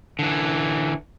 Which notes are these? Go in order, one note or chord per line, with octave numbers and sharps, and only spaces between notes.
D3 E3